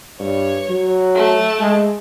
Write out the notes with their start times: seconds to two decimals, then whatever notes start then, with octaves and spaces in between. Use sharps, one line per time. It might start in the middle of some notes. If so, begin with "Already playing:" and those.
0.20 G2 C#5
0.69 F#3
1.15 A3 A5
1.60 G#3